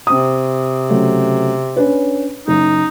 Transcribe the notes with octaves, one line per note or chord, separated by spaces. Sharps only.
C3 C4 D#6
C#3 F#3 A3
C#4 D4 B4
F#1 D#4